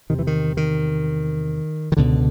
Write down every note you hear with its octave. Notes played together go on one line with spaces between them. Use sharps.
E2 C3 D#3
E3
D#3
D#3
D#3
C#2 B2 D3